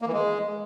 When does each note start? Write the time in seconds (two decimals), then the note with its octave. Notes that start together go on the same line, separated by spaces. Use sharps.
0.02 A#3
0.07 E3
0.13 G#3